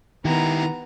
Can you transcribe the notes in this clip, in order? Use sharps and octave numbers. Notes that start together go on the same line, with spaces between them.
D#3 B3 E4 G4 A#5